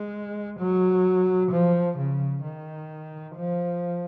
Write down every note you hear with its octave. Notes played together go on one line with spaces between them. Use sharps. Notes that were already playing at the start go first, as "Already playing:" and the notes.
Already playing: G#3
F#3
F3
C#3
D#3
F3